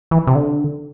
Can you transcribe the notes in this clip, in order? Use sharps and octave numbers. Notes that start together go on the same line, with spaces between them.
E3
C3
D3